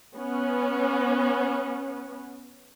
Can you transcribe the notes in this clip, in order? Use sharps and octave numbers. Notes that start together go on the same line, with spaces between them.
B3 C#4